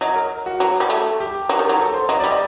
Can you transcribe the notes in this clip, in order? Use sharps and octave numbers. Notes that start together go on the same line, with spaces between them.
F#3 D#5
A#4
F#4
F#3 F#4
G3
A3
G4
F#3
D#3
F#3
A4
C5
F#3 D#5
G3 D5
D#5